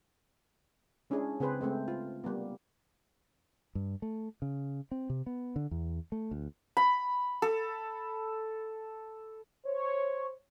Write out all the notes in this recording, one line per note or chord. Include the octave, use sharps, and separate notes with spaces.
G#3 C#4 D4 E4 G#4
C#3 C4 G#4 B4 C5
G#3 A3 C4
F4
G3 A#3 B3
G2
A3
C#3
C4
C3
B3
D3
E2
A3
D2
B5
A4
C5 C#5